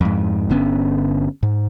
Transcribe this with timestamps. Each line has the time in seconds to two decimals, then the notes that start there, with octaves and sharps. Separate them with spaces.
0.01 F2 G#2
0.50 G1 D3 B3 C#4
1.43 G#2